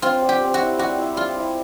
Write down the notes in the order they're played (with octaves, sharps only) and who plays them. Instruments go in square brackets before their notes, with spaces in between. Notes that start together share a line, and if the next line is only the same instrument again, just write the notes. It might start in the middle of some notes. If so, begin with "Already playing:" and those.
[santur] C4 [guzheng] F4
[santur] G3
[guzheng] G4
[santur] C4
[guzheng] F#4
[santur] E4
[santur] G3 [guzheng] F#4
[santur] E4
[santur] G3 [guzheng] F4
[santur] E4